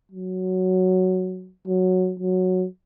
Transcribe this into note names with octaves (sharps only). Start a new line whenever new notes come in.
F#3
F#3
F#3